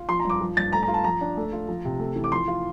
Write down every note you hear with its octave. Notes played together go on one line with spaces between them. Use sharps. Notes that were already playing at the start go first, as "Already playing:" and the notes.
Already playing: F4
F3 C6
A#5
G2
D6
F3
G2 A6
A3 A#5
A#5
F4
A5
F3 A#5
D4
A3
F4
F3
C3
A3
E3
D6
F3 C6
F4